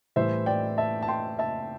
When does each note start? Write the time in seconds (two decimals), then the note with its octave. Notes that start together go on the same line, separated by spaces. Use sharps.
0.16 A2 E3 G3 C5 E5
0.46 D5 G5
0.78 E5 A5
1.03 A5
1.08 G5 C6
1.39 E5 A5